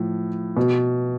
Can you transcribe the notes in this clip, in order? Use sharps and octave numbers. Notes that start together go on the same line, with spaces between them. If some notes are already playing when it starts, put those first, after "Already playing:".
Already playing: A2 F3
B2